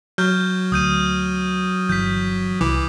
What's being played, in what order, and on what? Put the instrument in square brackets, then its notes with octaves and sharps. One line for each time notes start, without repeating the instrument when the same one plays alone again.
[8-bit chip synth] F#3 [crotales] F6 G6
[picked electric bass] D2 [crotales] D#6 G6 D#7
[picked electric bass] G1 E3 [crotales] G6 B6
[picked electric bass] C2 [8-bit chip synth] E3 [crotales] D6